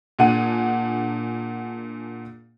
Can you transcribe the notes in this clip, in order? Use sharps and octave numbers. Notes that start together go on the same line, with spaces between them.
A#2 D4 G#4 F#5 D#7